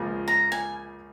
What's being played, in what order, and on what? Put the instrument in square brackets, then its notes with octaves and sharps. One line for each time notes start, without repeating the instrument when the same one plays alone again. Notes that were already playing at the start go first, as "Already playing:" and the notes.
Already playing: [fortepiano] C#2 C#3 F3 A#3
[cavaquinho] A#5
G#5